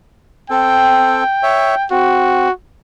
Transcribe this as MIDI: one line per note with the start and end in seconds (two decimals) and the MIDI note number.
0.50 1.24 60
0.50 1.24 69
0.50 1.86 79
1.43 1.75 73
1.43 1.75 76
1.91 2.49 60
1.91 2.51 66